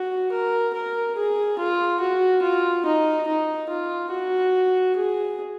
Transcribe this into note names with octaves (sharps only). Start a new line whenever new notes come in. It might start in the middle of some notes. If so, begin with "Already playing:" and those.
Already playing: F#4
A#4
A#4
G#4
F4
F#4
F4
D#4
D#4
F4
F#4
G#4